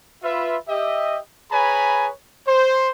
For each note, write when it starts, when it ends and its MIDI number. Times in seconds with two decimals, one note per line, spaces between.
0.24 0.57 65
0.24 0.57 71
0.24 0.57 76
0.69 1.19 67
0.69 1.19 75
0.69 1.19 76
1.52 2.09 68
1.52 2.09 71
1.52 2.09 73
1.52 2.09 80
1.52 2.09 82
1.52 2.09 83
2.47 2.90 72